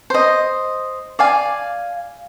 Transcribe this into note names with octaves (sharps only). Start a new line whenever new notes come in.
C5 D#5
D5 F5 G#5